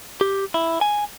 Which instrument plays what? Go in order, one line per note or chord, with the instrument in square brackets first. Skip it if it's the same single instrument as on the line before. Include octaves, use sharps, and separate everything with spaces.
[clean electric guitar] G4
E4
G#5